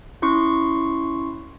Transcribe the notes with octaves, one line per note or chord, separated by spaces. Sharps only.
C#4 E4 C6 C#6